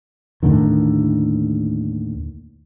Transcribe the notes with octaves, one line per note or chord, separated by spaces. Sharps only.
D#2 A2 D3 D#3